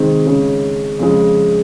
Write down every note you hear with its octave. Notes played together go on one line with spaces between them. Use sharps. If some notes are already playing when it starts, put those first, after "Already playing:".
Already playing: C3 D#3 G#3 C4
C#3 G#3 C#4
F2 C#3 G#3